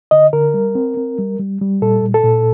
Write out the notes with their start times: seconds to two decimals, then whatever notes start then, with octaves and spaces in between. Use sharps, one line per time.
0.11 D3 D#5
0.33 D3 A#4
0.54 G3
0.75 C4
0.97 C4
1.19 G3
1.39 G3
1.61 G3
1.82 A#2 A4
2.03 A#2
2.14 A4
2.24 A#2